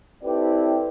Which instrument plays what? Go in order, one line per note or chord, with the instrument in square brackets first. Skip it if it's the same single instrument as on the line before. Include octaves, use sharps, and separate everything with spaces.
[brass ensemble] C4 E4 G4 A4 B4 D5